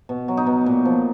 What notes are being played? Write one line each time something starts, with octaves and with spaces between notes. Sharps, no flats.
B2
F#3
D#4
B2
A#2
F3